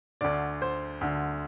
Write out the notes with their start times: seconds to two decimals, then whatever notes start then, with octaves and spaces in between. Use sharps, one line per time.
0.21 D2 D3 D5
0.62 C5
1.01 D2 D3